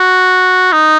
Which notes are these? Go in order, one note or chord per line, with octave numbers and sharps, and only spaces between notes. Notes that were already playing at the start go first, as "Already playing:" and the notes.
Already playing: F#4
D#4